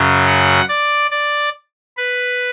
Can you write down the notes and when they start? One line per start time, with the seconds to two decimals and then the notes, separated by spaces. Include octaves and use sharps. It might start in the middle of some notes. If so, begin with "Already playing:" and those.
Already playing: F#2 C#3 F#3
0.27 F#5
0.69 D5
1.11 D5
1.97 B4